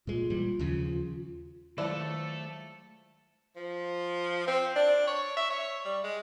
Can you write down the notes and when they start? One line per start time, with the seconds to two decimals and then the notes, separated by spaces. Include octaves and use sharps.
0.07 A#2 G#3 F4
0.30 A#2 E3 G3
0.59 D#2 C#3 F3
1.78 D#3 F3 F#3 G#3 A3 D4 E4 A4
3.56 F3
4.47 C4
4.76 D4
5.07 C#5
5.37 E5
5.50 C#5
5.85 G3
6.04 G#3